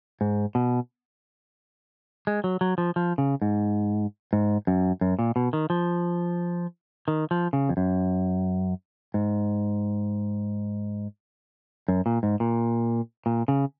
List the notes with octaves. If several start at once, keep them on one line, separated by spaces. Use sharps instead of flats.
G#2
B2
G#3
F#3
F#3
F3
F3
C#3
G#2
G#2
F#2
F#2
A#2
B2
D#3
F3
D#3
F3
C#3
F2
F#2
G#2
F#2
A#2
G#2
A#2
A#2
C#3